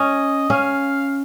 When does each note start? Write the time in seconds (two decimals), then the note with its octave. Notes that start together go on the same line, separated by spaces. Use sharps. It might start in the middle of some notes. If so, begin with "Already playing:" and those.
Already playing: C#4 D#5
0.50 C#4 F5